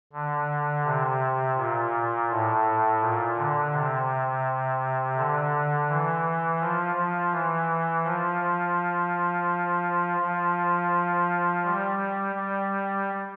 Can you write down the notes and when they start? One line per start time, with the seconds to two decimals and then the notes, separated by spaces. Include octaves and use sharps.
0.13 D3
0.84 C3
1.57 A#2
2.28 A2
3.00 A#2
3.36 D3
3.72 C3
5.16 D3
5.88 E3
6.60 F3
6.96 F3
7.32 E3
8.04 F3
10.20 F3
11.64 G3
12.35 G3